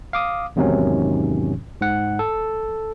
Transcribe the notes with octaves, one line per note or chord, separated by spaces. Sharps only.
F5 D6 D#6
E2 G#2 C3 D#3 F#3 C#4
G#2 F#5
A4